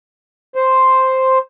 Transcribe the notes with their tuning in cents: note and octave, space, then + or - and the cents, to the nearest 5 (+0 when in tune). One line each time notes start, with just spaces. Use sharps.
C5 +0